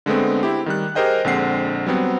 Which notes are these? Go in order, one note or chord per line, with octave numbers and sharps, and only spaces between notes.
D3 G#3 A3 B3 C4
C4 E4 G4
D#3 G3 F#6
G4 G#4 A#4 C5 D#5 G5
A#1 D3 G#3 C4 F#5 C7
F#3 G3 B3 C4